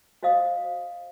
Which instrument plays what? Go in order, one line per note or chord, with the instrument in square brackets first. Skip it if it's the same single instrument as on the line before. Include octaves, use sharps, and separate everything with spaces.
[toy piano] F#4 C5 D#5 F5 D#6